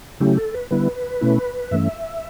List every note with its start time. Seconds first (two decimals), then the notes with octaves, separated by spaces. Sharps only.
0.20 C#3 F#3 A3 C#4 E4 G4
0.37 A4
0.54 B4
0.71 D3 G3 B3 E4 B4
1.21 B2 A3 C#4 E4
1.71 G2 E3 A3 C#4 E5